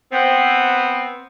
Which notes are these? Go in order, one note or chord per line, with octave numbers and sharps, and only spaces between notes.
B3 C4